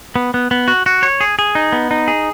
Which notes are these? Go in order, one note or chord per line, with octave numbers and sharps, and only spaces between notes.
B3
B3
B3
F#4
F#4
C#5
G#4
G#4
D#4
B3
D#4
G#4